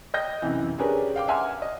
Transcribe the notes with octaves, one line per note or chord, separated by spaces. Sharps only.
D#5 G5 G6 A#6
F#2 C3 E3
C#4 D4 G4 G#4 A#4 B4
F5 G5 D6
E5 F#5 G#5 A#5 C6 F6
D#5